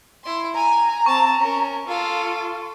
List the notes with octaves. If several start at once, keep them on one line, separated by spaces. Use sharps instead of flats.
E4 C6
G#5 A#5
C4 A5 C#6
C#4 A#4
F4 A4 F5